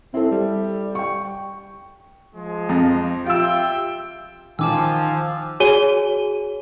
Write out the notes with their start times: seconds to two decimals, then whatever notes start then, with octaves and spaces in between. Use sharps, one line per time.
0.14 C4 E4 A4
0.32 G3
0.95 G5 C#6
2.36 F3 G#3
2.69 F2
3.26 F4 G4 E5 G5 E6
4.59 D#3 F3 G#5 A5 D6 E6
5.60 F#4 G#4 C#5 G#5 D#7 G7